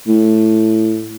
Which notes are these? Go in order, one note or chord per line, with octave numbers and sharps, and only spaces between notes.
A2